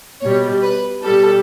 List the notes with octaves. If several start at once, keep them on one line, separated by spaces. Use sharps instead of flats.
B2 G3 C#5
B4
B2 G3 A4